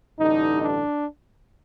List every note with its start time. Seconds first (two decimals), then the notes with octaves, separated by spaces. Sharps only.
0.18 A1 G2 D3 D#4
0.63 D4